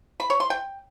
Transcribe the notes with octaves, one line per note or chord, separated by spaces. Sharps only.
B5
C#5
C6
G5